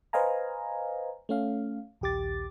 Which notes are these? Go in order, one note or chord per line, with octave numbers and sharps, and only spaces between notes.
B4 C5 D#5 F5 G#5 A#5
A3 C#4 F5
A#1 D#2 G4 D6 A6